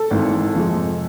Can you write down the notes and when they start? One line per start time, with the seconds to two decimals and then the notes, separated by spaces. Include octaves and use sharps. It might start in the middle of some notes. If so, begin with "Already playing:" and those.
Already playing: A4
0.11 G#1 G#2 E3
0.55 F2 C3 F3 G#3